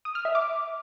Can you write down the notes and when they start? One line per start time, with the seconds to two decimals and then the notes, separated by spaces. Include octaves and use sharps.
0.05 D#6
0.15 F6
0.25 E5
0.35 D6